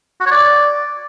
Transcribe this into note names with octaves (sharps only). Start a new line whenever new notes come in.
F#4
C#5
D5